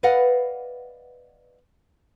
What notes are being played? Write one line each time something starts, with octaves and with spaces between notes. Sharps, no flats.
B4 D5 D#5 F5 F#5